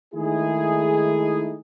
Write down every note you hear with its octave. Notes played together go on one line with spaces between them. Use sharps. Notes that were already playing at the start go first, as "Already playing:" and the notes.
D#3 G#3 A3 D#4 E4 G#4